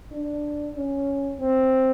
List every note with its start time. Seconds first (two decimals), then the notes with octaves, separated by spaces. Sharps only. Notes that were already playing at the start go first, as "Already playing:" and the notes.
0.12 D4
0.76 C#4
1.40 C4